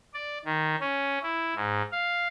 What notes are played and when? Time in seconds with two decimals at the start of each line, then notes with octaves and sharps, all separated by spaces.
0.14 D5
0.45 D#3
0.80 C#4
1.23 E4
1.55 G#2
1.92 F5